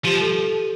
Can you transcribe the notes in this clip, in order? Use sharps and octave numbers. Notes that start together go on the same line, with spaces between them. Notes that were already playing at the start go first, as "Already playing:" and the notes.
F3 G4
A4